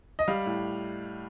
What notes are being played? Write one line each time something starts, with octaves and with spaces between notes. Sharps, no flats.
D#5
G3 F5
A2